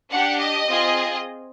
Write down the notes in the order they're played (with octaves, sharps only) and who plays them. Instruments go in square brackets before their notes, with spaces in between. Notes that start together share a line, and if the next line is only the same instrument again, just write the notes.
[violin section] D4 G4 F#5
D#5
C4 F4 G#4